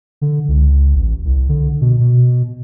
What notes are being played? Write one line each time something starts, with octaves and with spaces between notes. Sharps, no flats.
D3
C#2
A1
C2
D3
B2
B2